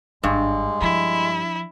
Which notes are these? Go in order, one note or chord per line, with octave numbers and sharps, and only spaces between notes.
G#1 G2 G#3
F3 E4